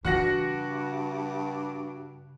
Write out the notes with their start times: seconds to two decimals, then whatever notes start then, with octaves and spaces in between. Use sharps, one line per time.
0.05 G2 C#3 E3 F#4 F#5 A#6